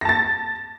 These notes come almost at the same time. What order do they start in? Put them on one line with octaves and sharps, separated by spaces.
A#6 A5 A6